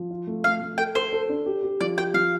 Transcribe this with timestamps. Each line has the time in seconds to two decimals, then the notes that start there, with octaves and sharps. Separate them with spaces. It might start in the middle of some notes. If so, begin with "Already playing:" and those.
Already playing: F3
0.11 F4
0.27 A3
0.44 A3 F5
0.61 A3
0.78 A4 G5
0.95 A4 C5
1.12 A4
1.29 D4
1.46 G4
1.63 G4
1.80 F3 D5
1.97 G4 G5
2.14 F3 F5